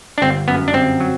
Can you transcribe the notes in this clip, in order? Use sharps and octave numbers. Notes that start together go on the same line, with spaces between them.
D4
G1 C4
F#2 B3
D4
G1 C4
F#3